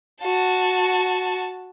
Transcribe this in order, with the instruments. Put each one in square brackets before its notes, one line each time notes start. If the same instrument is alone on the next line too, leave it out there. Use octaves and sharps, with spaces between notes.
[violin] F#4 A5